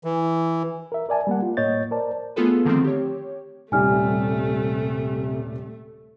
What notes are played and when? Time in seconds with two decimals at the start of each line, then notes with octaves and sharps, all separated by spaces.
0.04 E3
0.92 A#4 E5
1.09 A#4 D5 G#5 A5
1.27 G3 A#3 F#5
1.42 F4
1.57 A2 A#3 C#5 D#5 G6 A6
1.91 A#4 C5 D5 A5
2.36 A3 B3 F4 G#4 A4 B4
2.65 D3 D#3 F3 A3 C4
2.84 G4 C#5
3.72 D#1 C3 G3 A3 G#5 F6